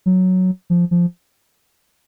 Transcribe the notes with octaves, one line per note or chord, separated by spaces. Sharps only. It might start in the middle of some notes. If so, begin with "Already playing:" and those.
F#3
F3
F3